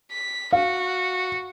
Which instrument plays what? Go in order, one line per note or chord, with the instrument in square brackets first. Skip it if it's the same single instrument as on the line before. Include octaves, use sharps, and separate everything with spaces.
[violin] B6
[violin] F#4 [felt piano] F5